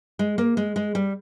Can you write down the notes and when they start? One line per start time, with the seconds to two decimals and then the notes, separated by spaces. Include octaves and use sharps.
0.19 G#3
0.38 A#3
0.57 G#3
0.76 G#3
0.95 G3